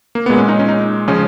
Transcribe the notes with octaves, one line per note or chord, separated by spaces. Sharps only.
A#3
A#2 G#3 B3
C#4
D#4
C#4
D#4
C#3 F3 G#3 C#4